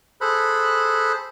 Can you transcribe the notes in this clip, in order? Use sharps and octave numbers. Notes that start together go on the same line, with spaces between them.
G#4 A4 C5 B5 F#6